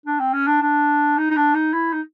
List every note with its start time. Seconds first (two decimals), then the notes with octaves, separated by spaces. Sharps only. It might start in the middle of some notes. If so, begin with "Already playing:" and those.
0.06 D4
0.20 C4
0.33 C#4
0.47 D4
0.62 D4
1.18 D#4
1.30 D#4
1.36 D4
1.54 D#4
1.73 E4
1.92 D#4